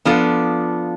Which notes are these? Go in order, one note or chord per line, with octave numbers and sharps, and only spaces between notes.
F3 B3 D4 F4 A4